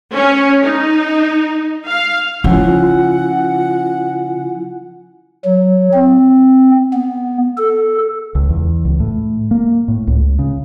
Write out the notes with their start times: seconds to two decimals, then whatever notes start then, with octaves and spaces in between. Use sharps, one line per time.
0.13 C#4
0.63 D#4
1.87 F5
2.44 C#3 F3 E4 F4 F#5 G#5
5.45 F#3
5.93 C4
6.93 B3
7.57 A4
8.35 C#2
8.49 E2
8.85 C#2
9.00 A2
9.51 A#3
9.88 A2
10.07 C#2
10.39 C#3